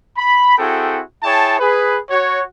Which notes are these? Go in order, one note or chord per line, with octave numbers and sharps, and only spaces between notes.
B5
C4 E4 F#4 G#4 A4 G5
E4 G#4 C#5 G5 A5
G#4 B4
F#4 C#5